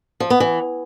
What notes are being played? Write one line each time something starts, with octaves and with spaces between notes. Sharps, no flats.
F3
B3
E3